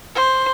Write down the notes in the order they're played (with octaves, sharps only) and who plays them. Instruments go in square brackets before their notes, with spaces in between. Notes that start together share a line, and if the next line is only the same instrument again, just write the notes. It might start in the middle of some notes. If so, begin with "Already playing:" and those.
[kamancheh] C5